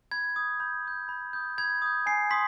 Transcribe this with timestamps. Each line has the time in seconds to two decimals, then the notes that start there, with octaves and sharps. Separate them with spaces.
0.11 B5 G#6
0.36 D#6 G6 G#6
0.60 B5 G6
0.85 D#6 G6
1.09 B5
1.33 D#6 G6
1.58 B5 G#6
1.82 D#6 G6
2.06 G#5 C7
2.31 C6 D#6 B6